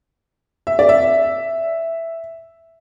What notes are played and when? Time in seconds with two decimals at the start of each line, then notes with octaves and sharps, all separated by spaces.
0.67 E5
0.79 D5
0.89 E5